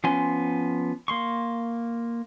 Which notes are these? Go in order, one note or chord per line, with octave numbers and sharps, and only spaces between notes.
F3 B3 C#4 G#5 C6
A#3 C6 C#6